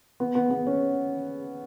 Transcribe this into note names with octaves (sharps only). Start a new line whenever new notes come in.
B3
B3
B3
C#4